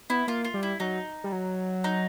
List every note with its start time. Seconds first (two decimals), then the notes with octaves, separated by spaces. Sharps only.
0.10 B3 E4
0.28 A#3 F4
0.44 F4
0.54 G3
0.63 E4
0.80 F#3 D#4
1.24 G3
1.32 F#3
1.84 D#4